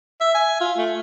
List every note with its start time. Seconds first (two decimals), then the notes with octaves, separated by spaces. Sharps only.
0.21 E5
0.35 G#5
0.61 F4
0.78 A3